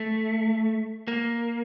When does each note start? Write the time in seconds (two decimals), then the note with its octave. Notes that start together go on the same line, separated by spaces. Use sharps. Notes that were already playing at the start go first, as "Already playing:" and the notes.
Already playing: A3
1.08 A#3